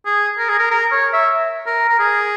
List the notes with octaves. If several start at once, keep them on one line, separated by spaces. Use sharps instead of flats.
G#4
A#4
G#4
A#4
A#4
C#5
E5
A#4
A#4
G#4